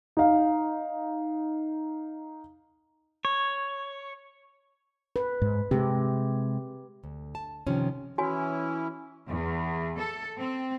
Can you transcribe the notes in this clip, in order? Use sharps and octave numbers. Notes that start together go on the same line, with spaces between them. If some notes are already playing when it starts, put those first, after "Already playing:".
D#4 F5
C#5
B4
G#2
C3 G#3 G4
D2
A5
C3 D#3 F3 C#4
E3 C#4 E4 F#4 C#5 G#5
E2
A4
C4